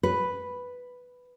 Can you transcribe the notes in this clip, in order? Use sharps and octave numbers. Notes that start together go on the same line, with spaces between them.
B4